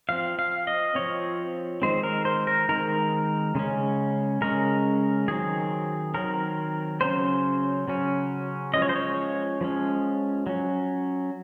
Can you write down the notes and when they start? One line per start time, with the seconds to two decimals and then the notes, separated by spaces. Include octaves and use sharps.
0.09 F3 C4 F5
0.39 F5
0.67 D#5
0.95 F3 C4 C#5
1.82 D#3 G#3 C4 C5
2.03 A#4
2.25 C5
2.47 A#4
2.69 D#3 G#3 C4 A#4
3.55 C#3 G#3 C#4
4.41 C#3 G#3 C#4 A#4
5.28 D#3 F#3 C4 G#4
6.14 D#3 F#3 C4 A#4
7.01 C#3 F#3 C#4 C5
7.88 C#3 F#3 C#4
8.74 F3 G#3 C#4 D#5
8.82 C#5
8.89 C5
8.96 C#5
9.61 F3 G#3 C#4
10.47 F#3 C#4